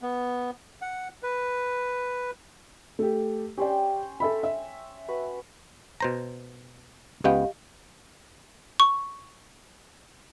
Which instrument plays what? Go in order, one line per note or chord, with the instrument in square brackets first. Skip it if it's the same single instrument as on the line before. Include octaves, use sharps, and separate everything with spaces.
[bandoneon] B3
F#5
B4
[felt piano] A3 G4
[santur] C#4 C5 G5 [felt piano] G4 D5
[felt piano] A4 E5 B5
E5
[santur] F#4 B4
[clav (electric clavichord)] B2 C5 A#5
[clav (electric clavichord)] C#2 B3 G5 [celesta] G4 D#5 F5
[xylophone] C#6